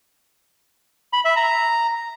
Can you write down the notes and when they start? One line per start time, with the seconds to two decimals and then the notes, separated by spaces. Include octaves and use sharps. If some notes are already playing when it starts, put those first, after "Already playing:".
1.13 B5
1.25 E5
1.36 A#5